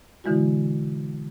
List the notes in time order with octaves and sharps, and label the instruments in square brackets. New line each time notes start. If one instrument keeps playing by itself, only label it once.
[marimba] B2 D3 E3 G#3 E4 F#4